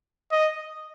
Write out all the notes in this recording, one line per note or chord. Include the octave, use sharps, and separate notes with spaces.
D#5